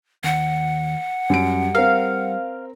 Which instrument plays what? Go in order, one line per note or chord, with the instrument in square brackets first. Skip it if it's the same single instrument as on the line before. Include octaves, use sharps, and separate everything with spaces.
[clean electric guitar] D#2 [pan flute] F#5
[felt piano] F#2 D7 [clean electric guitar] G3
[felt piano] C4 A#4 [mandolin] F5